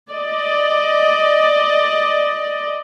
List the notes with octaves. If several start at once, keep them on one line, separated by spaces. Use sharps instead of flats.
D5 D#5